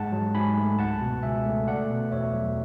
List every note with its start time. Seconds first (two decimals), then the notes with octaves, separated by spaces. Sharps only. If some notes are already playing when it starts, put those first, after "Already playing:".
Already playing: G#2 G#3 F#5 A5
0.12 F#3
0.34 G#2 G#5 B5
0.57 A3
0.79 C#2 F#5 A5
1.01 B2
1.23 C#2 E5 G#5
1.45 A3
1.67 A3 D5 F#5
1.90 B2
2.11 E2 C#5 E5
2.34 F#3